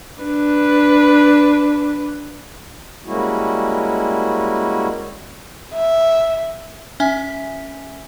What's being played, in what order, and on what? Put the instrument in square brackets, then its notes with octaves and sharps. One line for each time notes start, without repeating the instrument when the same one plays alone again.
[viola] D4 B4
[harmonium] G3 G#3 A#3 C#4 E4 F#4
[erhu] E5
[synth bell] C#4 E5 G#5